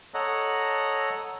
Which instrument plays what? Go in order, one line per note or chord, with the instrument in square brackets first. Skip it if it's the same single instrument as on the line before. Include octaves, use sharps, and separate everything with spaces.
[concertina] A4 C#5 D#5 F#5 A#5